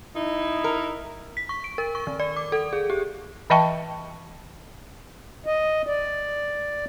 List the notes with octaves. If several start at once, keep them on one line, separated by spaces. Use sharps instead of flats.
D#4 E4
A#4
B6
C#6
D7
A#4
C#6
D#3
D5
D6
A4
G#4
G4
E3 D#5 E5 G5 A5 C#6
D#5
D5